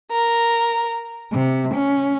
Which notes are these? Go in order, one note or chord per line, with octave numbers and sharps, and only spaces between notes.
A#4
C3
C#4